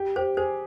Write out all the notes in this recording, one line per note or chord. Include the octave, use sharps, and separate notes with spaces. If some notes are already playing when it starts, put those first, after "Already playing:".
Already playing: G4
G4 C5
G#4 C5